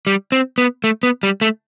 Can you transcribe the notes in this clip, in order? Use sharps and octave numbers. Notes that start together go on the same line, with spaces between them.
G3
C4
B3
A3
B3
G3
A3